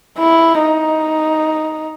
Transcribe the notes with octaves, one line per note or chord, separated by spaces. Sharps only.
E4
D#4